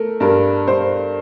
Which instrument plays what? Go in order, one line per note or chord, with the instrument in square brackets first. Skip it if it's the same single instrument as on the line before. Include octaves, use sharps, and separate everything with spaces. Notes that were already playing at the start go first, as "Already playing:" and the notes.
Already playing: [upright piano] A3 A#4
G2 A#4
G2 C5